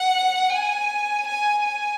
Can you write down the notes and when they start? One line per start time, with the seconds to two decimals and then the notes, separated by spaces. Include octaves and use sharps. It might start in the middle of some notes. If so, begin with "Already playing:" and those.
Already playing: F#5
0.50 G#5
1.27 G#5
1.64 G#5